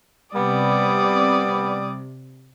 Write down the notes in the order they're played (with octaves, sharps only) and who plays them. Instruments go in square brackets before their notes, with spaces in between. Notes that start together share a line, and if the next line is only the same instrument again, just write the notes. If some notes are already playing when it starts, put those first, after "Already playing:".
[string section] C3 [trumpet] G3 [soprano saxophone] B3 [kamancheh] D5 D#6